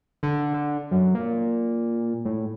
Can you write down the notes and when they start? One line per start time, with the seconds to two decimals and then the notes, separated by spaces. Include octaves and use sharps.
0.23 D3
0.54 D3
0.91 F#2
1.15 A#2
2.25 A2